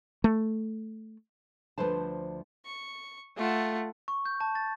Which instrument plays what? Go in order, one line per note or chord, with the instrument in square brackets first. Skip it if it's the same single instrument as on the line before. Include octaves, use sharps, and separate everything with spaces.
[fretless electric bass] A3
[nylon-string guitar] D2 A#2 F3 B4 C5 A5
[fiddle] C#6
[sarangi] A3 [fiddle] F4 F#5
[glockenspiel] C#6
G6
A5
A6